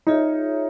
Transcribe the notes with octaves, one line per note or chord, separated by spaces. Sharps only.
D#4 F4 G#4 C#5 E5